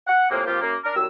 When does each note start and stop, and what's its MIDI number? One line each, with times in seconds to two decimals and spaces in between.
0.07 0.27 78
0.30 0.43 45
0.30 0.43 48
0.30 0.43 53
0.30 0.43 56
0.30 0.43 58
0.46 0.57 53
0.46 0.57 58
0.46 0.57 60
0.46 0.57 65
0.46 0.57 67
0.61 0.75 42
0.61 0.75 58
0.84 0.94 62
0.84 0.94 70
0.95 1.05 36
0.95 1.05 51
0.95 1.05 54
0.95 1.05 88